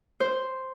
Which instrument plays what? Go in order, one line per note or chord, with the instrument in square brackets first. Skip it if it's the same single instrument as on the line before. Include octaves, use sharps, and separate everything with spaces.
[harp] C5